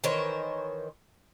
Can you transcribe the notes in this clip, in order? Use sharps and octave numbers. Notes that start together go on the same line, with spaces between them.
D#3 E3 C5 C#5